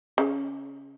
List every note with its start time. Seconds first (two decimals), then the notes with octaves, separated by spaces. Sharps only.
0.18 C#3